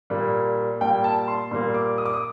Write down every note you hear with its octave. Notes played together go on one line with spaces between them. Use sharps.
A#2 G3 A#3
A#2 G3 A#3 G5
A5
C6
A#2 G3 A#3 C6
D6
D#6
D6
D#6